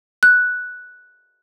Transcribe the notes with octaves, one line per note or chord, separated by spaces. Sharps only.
F#6